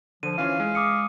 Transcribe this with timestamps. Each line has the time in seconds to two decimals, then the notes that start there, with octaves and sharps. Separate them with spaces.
0.23 D3 F3 D#7
0.38 E3 C#4 F4 F5
0.60 G#3
0.75 D6 D#6 C#7